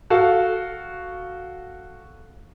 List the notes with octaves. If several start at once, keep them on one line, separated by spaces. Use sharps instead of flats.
F#4 A4 F5